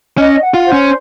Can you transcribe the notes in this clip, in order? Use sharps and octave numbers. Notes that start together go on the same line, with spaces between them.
C#4 D#5
F#5
F4
C5
C#4